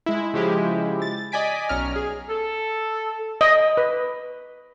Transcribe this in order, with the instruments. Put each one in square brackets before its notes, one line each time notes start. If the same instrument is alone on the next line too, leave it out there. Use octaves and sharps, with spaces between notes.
[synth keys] G#3 E4
C#3 F3 G#3 E4 G4
A6
D5 D#5 G#5 B6 D7
B1 C#4 A#5 F6
G#4
[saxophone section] A4
[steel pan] D#5
B4